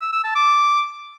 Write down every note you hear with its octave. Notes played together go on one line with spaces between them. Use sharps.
E6
E6
A5
D6